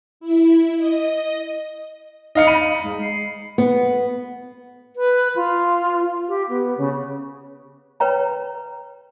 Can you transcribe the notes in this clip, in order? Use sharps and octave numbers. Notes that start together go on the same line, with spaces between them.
E4
D#5
D#4 D#5 F5 C#7
B5 D#7
G#2
C7
B3
B4
F4
G4
B3
C#3
B4 C#5 G5 A#5